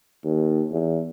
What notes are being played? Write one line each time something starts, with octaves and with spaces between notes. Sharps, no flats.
D#2
E2